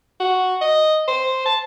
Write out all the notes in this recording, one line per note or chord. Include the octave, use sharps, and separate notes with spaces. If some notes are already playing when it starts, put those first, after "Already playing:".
F#4
D#5
C5
A5